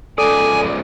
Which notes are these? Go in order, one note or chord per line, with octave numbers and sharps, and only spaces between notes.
C#2 A4 D5 G#5 D#6